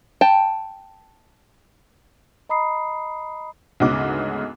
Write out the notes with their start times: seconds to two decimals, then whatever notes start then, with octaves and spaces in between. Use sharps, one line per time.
0.21 G5 A5
2.49 D#5 A#5 B5 D#6 C7
3.80 D2 G#2 C#3 B3 D#5 D6